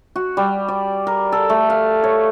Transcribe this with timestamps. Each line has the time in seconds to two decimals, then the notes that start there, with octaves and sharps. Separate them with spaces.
0.16 F#4
0.37 G3
0.68 D5
1.07 A#4
1.32 A4
1.50 A3
1.70 F5
2.04 C#5